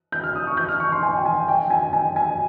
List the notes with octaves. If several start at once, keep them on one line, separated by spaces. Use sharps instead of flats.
G6
F6
D#6
C#6
G6
F6
C#6
C6
G#5
G5
G#5
G5
G#5
G#5
G#5